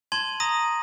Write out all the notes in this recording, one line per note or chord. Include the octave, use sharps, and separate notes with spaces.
A5 C6 G#6 D#7 F#7
A#5 D#6 A#6 D#7